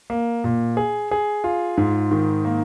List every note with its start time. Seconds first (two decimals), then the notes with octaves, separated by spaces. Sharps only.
0.10 A#3
0.44 A#2
0.77 G#4
1.11 G#4
1.44 F4
1.77 G#2
2.11 D#3
2.45 A#3